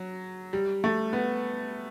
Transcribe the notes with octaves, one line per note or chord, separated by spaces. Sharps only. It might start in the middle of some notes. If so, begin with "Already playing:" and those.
Already playing: F#3
G3
A3
B3